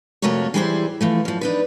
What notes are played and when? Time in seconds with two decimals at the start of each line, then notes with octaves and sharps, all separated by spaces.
0.22 F2 C3 A3 F#4 A#4 C#5
0.54 E3 G3 E4 G#4 A#4 C5
1.01 E3 F3 A3
1.25 F#2 F3
1.41 D4 D#4 B4